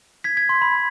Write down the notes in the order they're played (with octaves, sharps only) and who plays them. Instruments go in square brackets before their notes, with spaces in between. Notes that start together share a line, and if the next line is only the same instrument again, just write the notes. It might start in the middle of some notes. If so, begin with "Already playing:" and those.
[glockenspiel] G#6 B6
G#6 B6
C6
B5